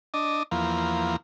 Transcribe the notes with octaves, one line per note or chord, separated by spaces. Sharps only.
D4 D#5
E2 F3 A#3